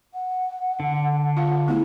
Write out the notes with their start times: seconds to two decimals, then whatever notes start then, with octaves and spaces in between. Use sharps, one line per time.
0.14 F#5
0.80 D3
1.37 F4 F5
1.68 A3 B3 E4